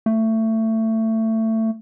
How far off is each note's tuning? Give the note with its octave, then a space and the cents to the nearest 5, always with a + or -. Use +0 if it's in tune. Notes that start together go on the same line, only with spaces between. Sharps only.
A3 +20